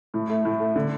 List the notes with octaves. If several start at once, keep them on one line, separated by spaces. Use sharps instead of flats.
A2
A3
A2
A3
D3